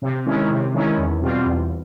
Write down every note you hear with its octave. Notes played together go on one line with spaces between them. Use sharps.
C3
D#3 G#3 C#4 E4
C3
D#3 G#3 C#4 E4
E2
B2 G3 C4 F4
E2